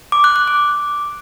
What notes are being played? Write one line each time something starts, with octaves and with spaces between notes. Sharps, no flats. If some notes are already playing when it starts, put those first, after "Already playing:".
D6
F#6
F#6
D6